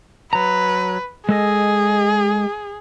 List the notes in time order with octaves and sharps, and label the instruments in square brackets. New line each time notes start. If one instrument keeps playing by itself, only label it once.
[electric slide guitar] F#3 A#5 [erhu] B4
[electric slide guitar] G#3 A4 D#5 [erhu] G#4